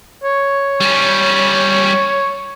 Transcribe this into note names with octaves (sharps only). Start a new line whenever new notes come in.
C#5
G3 C#4